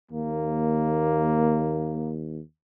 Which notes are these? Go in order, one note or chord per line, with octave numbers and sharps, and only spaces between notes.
D#2 A#3